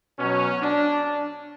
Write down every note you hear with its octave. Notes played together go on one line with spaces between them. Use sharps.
B2 F#3 C#4
D4